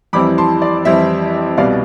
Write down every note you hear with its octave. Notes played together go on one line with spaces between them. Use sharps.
F2 E3 G3 C4 E4 B5 D6
A5 C6
D5
F2 E3 G3 C4 E4 E5
C2 B2 G3 D5 F5